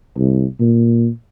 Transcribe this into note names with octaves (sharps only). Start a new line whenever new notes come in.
C2
A#2